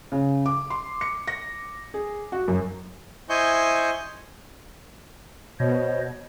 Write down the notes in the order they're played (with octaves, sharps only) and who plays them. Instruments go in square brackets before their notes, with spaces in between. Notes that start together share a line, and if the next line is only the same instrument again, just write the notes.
[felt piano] C#3
D6
C6
C#7
A#6
G#4
F#4
F#2
[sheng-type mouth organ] E4 C5 D#5 G#5 C#6 G6
[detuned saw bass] B2 [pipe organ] C5 C#5 D#5